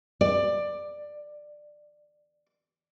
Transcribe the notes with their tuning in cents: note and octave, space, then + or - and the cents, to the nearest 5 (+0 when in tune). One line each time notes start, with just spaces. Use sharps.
D5 +15